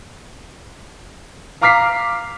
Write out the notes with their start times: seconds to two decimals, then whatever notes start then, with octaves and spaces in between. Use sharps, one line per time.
1.61 F5 A#5 D6 F6 B6 C7